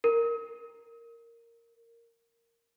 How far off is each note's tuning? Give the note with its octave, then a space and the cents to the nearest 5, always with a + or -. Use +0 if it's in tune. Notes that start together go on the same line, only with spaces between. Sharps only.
A#4 -10